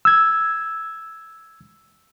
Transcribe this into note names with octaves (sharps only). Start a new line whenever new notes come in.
E6 G#6